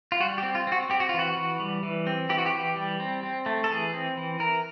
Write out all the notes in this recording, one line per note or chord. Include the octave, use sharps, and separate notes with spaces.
F4
G3 F#4
G4
C4
F4
C4 F#4
C4 G4
F#4
F4
E3
F#4
E3
G3
E3
C4
E3 G4
F#4
G4
E3
G3
C4
C4
A3
A4
E3 G#4
C4
E3
E3 A#4